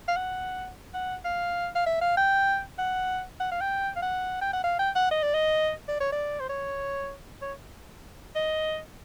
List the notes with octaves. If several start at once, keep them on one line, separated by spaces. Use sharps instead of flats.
F5
F#5
F#5
F5
F5
E5
F5
G5
F#5
F#5
F5
G5
F5
F#5
G5
F#5
F5
G5
F#5
D#5
D5
D#5
D5
C#5
D5
C5
C#5
C#5
D#5